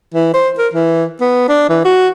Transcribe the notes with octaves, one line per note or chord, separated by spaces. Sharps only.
E3
C5
A#4
E3
B3
D4
E3
F#4